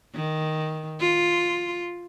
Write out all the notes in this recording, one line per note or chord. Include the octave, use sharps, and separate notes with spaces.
D#3
F4